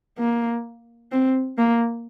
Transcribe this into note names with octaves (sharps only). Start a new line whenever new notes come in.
A#3
C4
A#3